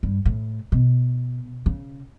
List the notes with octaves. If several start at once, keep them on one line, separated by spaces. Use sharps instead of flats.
G2
A2
B2
C#3